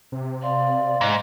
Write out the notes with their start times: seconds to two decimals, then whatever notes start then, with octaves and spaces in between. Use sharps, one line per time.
0.12 C3
0.42 D5 F5 C6
1.01 G#2 D#5